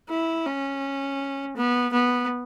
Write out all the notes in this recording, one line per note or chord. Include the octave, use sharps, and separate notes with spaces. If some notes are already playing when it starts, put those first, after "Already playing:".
E4
C#4
B3
B3